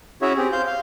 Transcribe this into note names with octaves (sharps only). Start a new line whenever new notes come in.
C#4 E4 F#4 G#4 C#5 E5
C4 G4 G#4
C5 F5 G6
F5